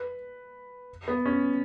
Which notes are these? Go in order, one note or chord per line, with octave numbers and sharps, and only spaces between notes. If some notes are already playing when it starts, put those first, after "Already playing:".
Already playing: B4
B3
C#4